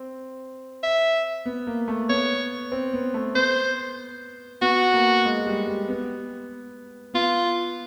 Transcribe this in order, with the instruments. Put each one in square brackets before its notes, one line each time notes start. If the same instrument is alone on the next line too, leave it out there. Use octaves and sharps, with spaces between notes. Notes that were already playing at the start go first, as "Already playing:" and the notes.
Already playing: [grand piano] C4
[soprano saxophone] E5
[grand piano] B3
A#3
A3
[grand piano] B3 [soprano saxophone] C#5
[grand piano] C4
B3
A3
[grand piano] B3 [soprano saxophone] C5
[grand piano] B3 [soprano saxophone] F#4
[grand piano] A#3
G#3
G3
G3
B3
[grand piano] B3 [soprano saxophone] F4